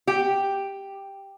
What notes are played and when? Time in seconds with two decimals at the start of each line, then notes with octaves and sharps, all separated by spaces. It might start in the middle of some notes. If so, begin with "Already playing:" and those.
0.07 G4